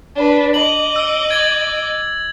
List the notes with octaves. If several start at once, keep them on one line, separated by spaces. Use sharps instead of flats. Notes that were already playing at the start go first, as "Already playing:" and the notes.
D4 B4
D#5 D6 F#7
E6
G#6 A6 F#7